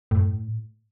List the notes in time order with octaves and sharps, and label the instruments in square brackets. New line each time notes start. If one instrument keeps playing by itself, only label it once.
[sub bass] F#2 [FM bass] A2